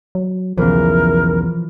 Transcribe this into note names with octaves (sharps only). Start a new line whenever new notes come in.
F#3
B1 E2 C#3 E3 F3 A#4